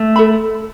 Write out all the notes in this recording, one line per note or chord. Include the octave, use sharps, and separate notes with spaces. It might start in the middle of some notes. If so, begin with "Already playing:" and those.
Already playing: A3
A4 E5 B5